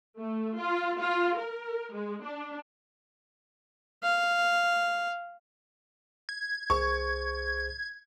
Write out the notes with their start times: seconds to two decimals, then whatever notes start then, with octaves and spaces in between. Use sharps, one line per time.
0.18 A3
0.59 F4
1.01 F4
1.39 A#4
1.94 G#3
2.24 D4
4.03 F5
6.29 G#6
6.70 C2 G#4 C5 C#6